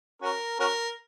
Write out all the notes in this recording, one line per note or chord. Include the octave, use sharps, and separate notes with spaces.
C#4 F#4 A#4
C#4 F#4 A#4